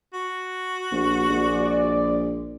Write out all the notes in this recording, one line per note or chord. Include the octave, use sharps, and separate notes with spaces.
F#4
A#1
A#1 G#3 D5